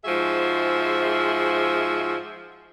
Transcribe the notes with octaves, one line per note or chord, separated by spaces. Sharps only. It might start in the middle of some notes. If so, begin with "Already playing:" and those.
G#2 F3 F#4 G#4 E5